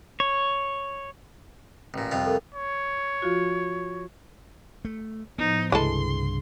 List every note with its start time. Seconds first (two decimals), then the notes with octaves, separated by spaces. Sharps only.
0.20 C#5
1.94 A1 A#2
2.12 C2 F2 F4
2.26 A4 A#4
2.54 C#5
3.22 F3 F4 F#4
4.85 A3
5.39 A2 F3 B3 D#4
5.72 C2 G2 C#3 E3 G#3 A4 C6